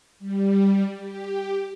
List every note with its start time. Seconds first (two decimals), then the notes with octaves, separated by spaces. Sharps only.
0.19 G3
1.01 G4